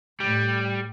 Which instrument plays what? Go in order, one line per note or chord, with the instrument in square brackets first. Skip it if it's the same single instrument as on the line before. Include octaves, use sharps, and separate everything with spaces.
[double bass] A2 [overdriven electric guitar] G3